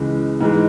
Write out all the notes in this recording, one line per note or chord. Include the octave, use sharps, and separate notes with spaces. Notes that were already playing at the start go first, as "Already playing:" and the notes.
Already playing: C#2 C#3 E3 G#3
G#2 E3 G#3